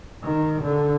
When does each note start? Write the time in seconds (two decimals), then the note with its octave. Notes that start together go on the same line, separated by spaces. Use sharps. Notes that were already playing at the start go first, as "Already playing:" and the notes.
0.23 D#3
0.62 D3